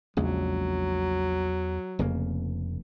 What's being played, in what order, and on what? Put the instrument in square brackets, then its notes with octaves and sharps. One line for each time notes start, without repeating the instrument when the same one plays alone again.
[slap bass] A#1 C#3 G#3 [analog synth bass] E2 [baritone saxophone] F#3
[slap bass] F1 C#3 A#3 [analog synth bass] F2